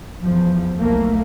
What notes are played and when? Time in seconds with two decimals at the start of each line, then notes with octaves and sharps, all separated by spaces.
0.22 E2 F3
0.78 B1 A3 A#3